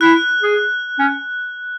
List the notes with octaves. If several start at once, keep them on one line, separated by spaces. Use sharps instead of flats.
E4 F#6
G#4
C#4